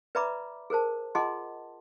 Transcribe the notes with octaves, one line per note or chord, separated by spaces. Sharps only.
B4 D5 E5 A#5 B5 D6
G#4 A#4 C5 A5
F4 G#4 D#5 F#5 A5 C6